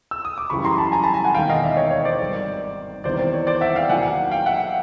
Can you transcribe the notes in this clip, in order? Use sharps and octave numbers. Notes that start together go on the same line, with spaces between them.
E6
D#6
D6
F#2 C#3 E3 G3 B5 C#6
A#5 C6
A5 B5
G#5 A#5
A5 B5
G#5 A#5
F#5 G#5
E1 D#2 D#3 F5 G5
D#5 F5
D5 E5
C#5 D#5
C#5
C5 D5
G#1 G2 D#3
E2 C3 D#3 G3 C5 D5
C5
C#5
C5 D5
E5 F#5
F5 G5
D#2 D#3 F#3 F#5 G#5
F5 G5
E5 F#5